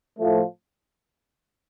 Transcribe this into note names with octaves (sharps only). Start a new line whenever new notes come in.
A2 F3 A3